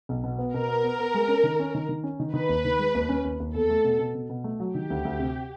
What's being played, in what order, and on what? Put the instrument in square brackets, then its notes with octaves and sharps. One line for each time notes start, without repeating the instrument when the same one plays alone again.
[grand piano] B1
B2
B3
[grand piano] B2 [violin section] A#4
[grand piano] B3
B3
B3
G#3
C#4
D#3
C#4
D#3
D#3
C#4
D#3
[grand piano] D#3 [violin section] B4
[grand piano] D#2
D#3
G#3
D#2
C#4
D#2
D#2
[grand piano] E2 [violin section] A4
[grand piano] A3
B2
B2
B2
B2
A3
F#3
[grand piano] D#3 [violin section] G4
[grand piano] D2
D2
C3